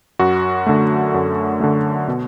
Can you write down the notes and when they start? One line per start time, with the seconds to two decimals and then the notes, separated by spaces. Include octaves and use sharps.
0.19 F#2 F#4
0.67 D3 A3
1.14 F#2
1.60 D3 A3
2.08 B2